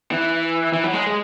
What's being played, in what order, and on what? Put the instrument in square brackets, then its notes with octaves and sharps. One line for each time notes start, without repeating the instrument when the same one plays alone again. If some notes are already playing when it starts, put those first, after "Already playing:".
[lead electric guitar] E3
E3
F#3
G#3
G#3